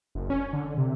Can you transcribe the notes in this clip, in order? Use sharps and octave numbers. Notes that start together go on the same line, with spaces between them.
F#1
C#4
D3
C3